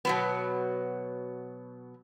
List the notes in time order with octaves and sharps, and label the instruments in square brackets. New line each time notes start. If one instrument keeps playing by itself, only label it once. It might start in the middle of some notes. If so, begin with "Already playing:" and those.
[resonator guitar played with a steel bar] B2 F#3 B3